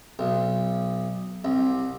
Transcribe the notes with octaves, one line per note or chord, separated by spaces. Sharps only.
B1
C2